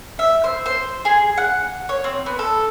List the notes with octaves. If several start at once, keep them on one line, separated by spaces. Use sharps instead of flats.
E5
C5
C5
G#4
F#5
C#5
C4
B3
A4